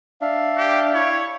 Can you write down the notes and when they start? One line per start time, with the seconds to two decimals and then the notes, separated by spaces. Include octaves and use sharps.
0.22 D4 E5 F5
0.57 G4
0.94 E4 C#5